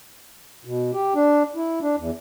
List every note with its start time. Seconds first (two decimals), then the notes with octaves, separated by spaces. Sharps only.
0.65 B2
0.93 G4
1.15 D4
1.55 E4
1.82 D4
1.98 E2